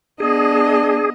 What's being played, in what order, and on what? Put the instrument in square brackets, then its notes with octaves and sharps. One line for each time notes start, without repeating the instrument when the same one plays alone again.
[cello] B3 D#5 [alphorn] D4 [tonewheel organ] G#4